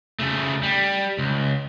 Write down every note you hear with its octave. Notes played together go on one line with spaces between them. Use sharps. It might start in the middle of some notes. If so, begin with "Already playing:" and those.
C#3 A3
G3
C#2